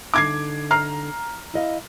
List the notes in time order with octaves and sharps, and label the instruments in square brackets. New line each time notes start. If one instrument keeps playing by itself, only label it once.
[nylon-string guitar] D3 D#4 [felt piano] D6 G#6 C7
[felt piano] A#5 F6 C7
[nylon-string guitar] E4 D#5 F5